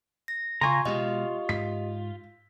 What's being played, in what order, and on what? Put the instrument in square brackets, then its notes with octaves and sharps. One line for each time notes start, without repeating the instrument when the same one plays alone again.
[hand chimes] A#6
[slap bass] C#3 [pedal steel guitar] F4 G#5 A#5 [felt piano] C6 C#6
[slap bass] B2 G#3 [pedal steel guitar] F4 [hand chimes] G4 D#5
[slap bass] G#2 [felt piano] B6